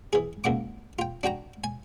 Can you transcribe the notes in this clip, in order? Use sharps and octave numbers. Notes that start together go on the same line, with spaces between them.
E3 G#4
C#2 A#3 F#5 D6
F4 G5
D4 F#4 G5 A#5
G#5